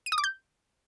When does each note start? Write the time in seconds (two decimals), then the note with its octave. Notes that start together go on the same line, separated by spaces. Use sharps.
0.06 D#7
0.12 D#6
0.18 D6
0.24 G6